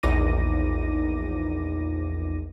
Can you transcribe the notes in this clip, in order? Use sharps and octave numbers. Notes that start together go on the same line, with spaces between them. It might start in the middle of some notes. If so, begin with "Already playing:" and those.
A#1 E2 D#4 D6 A#6 D#7